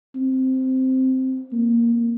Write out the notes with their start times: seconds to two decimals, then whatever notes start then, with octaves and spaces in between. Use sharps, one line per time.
0.16 C4
1.52 A#3